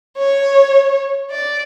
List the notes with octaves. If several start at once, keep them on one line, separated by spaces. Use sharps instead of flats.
C#5
D5